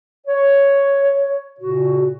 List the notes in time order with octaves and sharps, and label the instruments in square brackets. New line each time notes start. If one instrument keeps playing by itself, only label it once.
[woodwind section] C#5
A#2 C#3 F#4